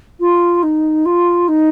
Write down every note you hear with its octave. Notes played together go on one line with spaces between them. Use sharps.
F4
D#4
F4
D#4